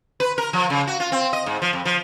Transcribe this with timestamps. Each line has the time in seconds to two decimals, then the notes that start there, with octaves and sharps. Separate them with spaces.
0.20 B4
0.38 A#4
0.53 F3
0.70 C#3
0.87 F#4
1.00 F4
1.12 C4
1.33 D#5
1.46 G#2
1.62 F3
1.73 F2
1.85 F3